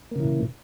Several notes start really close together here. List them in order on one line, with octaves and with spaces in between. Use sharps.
A#3 C#3 E3 A#2